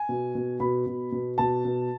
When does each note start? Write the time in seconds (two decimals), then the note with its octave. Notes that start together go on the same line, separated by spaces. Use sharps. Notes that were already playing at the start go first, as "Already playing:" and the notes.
Already playing: G#5
0.09 B2
0.35 B2
0.60 B2 B5
0.86 B2
1.12 B2
1.38 B2 A5
1.65 B2